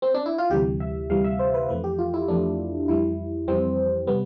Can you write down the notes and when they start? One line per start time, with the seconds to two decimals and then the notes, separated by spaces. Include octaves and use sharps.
0.02 C4
0.14 D4
0.26 E4
0.38 F4
0.50 D2 C3 E3 G3 G4
0.80 E5
1.10 D2 C3 E3 G3 F5
1.24 E5
1.39 C5
1.54 B4
1.69 F2 E3 A3 B4
1.84 G4
1.98 F4
2.14 E4
2.28 F2 E3 A3 D4
2.88 F2 E3 G3 E4
3.47 F2 E3 G3 C4
4.07 C3 G3 B3